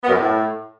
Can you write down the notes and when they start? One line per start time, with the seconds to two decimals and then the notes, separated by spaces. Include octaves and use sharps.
0.03 B3
0.08 F#2
0.13 B3
0.18 A2